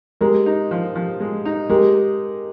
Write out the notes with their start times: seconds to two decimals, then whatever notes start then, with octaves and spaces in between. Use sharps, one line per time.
0.21 G#3 G4 A#4
0.46 D#4
0.71 F3
0.95 F3
1.20 G#3
1.45 D#4
1.69 G#3 G4 A#4